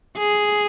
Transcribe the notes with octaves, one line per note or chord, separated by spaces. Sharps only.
G#4